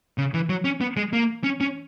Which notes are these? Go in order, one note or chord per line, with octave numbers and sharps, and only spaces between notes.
C#3
E3
F#3
C#4
B3
G#3
A#3
C#4
C#4